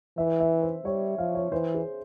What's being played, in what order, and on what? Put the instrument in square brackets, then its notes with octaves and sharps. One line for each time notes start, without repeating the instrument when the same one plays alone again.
[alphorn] E3 [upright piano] E5
[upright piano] E5
C5
[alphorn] G3 [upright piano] C#5
[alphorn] F3 [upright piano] F5
[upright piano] C#5
[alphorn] E3 [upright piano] C5
[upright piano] G#4